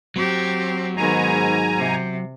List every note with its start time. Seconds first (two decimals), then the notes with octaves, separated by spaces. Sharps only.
0.16 F#3 C4 G4
0.97 G#2 D#3 B3 G#5 A#5
1.78 C3